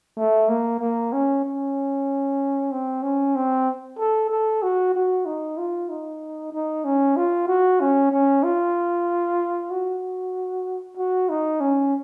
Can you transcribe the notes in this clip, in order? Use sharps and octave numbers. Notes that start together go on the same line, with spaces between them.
A3
A#3
A#3
C#4
C#4
C4
C#4
C4
A4
A4
F#4
F#4
D#4
F4
D#4
D#4
C#4
F4
F#4
C#4
C#4
F4
F#4
F#4
D#4
C#4